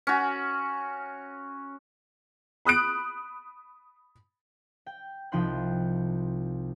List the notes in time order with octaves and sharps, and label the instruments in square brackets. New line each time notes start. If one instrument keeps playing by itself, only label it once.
[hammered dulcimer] C#4 F#4
[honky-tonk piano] B5 D#6 F#6 D7
[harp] G5
C2 F3 D#4 G5 C6 F#6